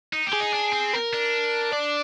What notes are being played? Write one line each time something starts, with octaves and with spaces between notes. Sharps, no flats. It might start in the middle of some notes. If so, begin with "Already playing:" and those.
D#4
G4
G#4
D#4
D4
C4
A#4
D4
D5